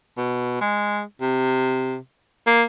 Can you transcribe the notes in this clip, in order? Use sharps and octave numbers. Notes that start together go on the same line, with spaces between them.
B2
G#3
C3
A#3